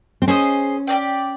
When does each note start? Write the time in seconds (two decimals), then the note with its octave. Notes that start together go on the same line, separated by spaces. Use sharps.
0.22 C4
0.28 C#4 G#4 C5 D#5
0.87 G4 A#4 D5 G5